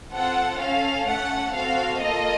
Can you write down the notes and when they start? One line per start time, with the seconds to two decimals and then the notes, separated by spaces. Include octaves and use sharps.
0.14 C4 F4 A4 F#5
0.61 C#4 A4 F5
1.08 A3 C#4 A4 F#5
1.54 C4 F#4 A4 F5
2.01 A#3 F4 A4 D#5